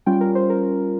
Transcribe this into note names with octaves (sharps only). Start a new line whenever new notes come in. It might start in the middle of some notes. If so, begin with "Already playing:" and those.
G3 C#4 F4 G5
A#4
C5
A#4